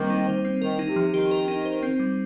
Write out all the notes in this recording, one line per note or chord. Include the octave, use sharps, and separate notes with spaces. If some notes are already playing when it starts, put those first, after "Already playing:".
Already playing: D#3 G3 A#3 C4 C5
D#4
C5
C4
D#3 A#4
D#4
C3
F3
D#3 G4
A#4
D#4
C5
C4
G3